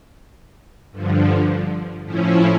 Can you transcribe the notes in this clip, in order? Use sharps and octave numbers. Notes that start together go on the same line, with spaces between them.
G2 D3 F3
A2 F3 C#4 E4